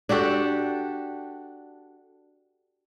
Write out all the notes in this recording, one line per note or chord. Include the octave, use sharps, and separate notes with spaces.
D4 F#4 G4 A4